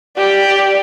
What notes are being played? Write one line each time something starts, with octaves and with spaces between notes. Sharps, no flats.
G4 D5